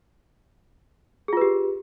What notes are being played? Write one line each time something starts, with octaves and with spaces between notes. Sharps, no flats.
F4 G4 G#4 B4